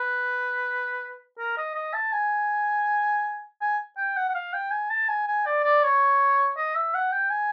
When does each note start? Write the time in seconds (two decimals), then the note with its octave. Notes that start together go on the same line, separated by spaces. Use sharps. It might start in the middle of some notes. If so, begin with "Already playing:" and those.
Already playing: B4
1.39 A#4
1.57 D#5
1.75 D#5
1.94 A5
2.13 G#5
3.61 G#5
3.97 G5
4.17 F#5
4.29 F#5
4.34 F5
4.54 G5
4.71 G#5
4.90 A5
5.08 G#5
5.27 G#5
5.46 D5
5.64 D5
5.83 C#5
6.57 D#5
6.75 E5
6.94 F#5
7.12 G5
7.30 G#5